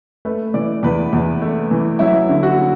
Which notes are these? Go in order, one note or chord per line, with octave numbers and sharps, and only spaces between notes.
A3 B4
E3 D5
E2 B4
E2
A3
E3
F#3 E4
D3
F#4